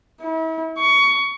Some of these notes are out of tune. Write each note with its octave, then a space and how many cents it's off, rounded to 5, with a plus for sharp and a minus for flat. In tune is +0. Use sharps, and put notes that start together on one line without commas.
E4 -40
C#6 +20